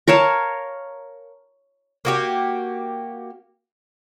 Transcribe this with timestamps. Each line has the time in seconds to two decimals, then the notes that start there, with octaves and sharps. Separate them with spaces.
0.08 A#4 C#5 F5 A5
2.05 A#3 F#4 G4